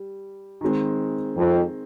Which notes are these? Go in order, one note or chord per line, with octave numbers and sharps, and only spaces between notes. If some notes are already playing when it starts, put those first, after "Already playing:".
Already playing: G3
D#3 G#3 C4
F2